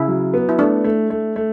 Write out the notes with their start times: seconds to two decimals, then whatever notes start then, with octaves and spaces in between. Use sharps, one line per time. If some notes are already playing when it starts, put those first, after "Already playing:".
Already playing: C#3 E4
0.08 F#3
0.34 B3
0.49 E4
0.59 A3 D4
0.84 A3
1.10 A3
1.36 A3